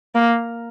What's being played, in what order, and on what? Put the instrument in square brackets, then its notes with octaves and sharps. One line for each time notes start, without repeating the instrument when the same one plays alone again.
[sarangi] A#3